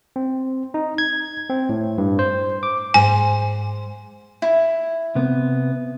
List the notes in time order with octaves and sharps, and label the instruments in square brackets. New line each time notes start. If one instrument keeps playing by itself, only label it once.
[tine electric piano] C4
D#4
G#6
C4
A2
G2
C5
D6
[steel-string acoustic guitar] G#2 C5 [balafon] G#5
[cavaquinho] E4
[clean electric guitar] C3 B3